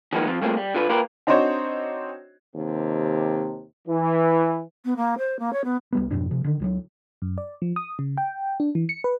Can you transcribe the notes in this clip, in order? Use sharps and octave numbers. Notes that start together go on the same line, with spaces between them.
D#3 F3 G#3 A#3 B3 D#4
F3 C4 F4
G3 A3 A#3 C4 F4 G#4
G3
D3 F4 B4
A#3 F4 G4 A#4 B4
C4 D4 D#4 F#4 C5 C#5
D#2 C3
E3
B3
A#3
C5
A#3
C#5
B3
C2 G3 B3
F2 G#2 B2 D4
C3 F3
D3 D#3
C#2 F3 F#3
F#2
D5
F3
D#6
C#3
G5
D4
E3
C#7
B4